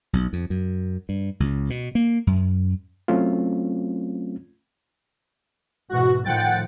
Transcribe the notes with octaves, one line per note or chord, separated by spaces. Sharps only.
B1
F2
F#2
G2
C#2
B2
A#3
F#2
F#3 A3 C4 C#4 F4
G#2 B2 E3 F#4
A2 D#3 F3 F#5 G5 A6